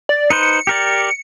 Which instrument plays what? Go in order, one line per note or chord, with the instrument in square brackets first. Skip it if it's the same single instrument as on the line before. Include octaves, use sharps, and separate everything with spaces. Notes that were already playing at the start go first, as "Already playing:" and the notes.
[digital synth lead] D5
[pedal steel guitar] D#4 B4 C5 [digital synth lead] C#7
[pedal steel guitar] G4 A#4 D5